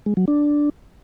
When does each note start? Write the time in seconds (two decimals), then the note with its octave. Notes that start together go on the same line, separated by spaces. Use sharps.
0.06 G#3
0.17 F#3
0.28 D4